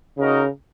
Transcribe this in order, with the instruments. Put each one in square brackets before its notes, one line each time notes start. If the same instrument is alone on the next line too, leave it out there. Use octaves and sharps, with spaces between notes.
[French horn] C#3 [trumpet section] D#4 F#4 A#4 D#5